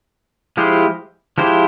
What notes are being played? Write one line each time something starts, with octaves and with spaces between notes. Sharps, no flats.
F3 G#3 E4 G4 C5
F3 G#3 E4 G4 C5